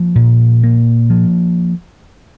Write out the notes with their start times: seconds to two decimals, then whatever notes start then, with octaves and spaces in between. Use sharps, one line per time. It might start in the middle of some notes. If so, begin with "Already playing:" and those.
Already playing: F3 A#3
0.15 A#2
0.63 A#3
1.10 F3